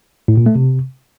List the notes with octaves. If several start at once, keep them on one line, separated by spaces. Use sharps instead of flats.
A2
A#2
A3
C3